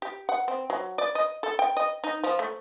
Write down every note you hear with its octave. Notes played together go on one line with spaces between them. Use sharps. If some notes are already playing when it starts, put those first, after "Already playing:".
G4
F#5
C4
F#3
D5
D#5
A4
G5
D#5
D#4
F3
A3